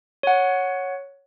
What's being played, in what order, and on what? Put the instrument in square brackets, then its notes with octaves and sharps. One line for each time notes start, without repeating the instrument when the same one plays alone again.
[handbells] C#5 F#5